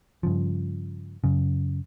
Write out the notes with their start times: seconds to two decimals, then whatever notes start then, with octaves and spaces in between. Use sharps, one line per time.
0.23 G2 C#3 F3
1.24 F#2 C#3